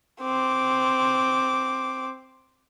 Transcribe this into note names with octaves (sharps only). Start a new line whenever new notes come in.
C4 D6